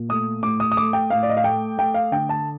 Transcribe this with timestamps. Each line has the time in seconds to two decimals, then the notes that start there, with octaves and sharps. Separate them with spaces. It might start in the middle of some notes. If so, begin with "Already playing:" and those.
Already playing: A#2
0.09 A3 D#6
0.43 A2 D6
0.60 D#6
0.72 D#6
0.77 A3 D6
0.93 G5
1.10 A2 F5
1.23 D5
1.29 D#5
1.37 F5
1.44 A3 G5
1.78 A3 G5
1.94 F5
2.12 D3 G5
2.29 A5